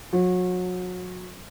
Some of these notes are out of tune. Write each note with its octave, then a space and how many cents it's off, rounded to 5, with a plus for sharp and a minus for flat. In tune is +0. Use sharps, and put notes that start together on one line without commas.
F#3 -30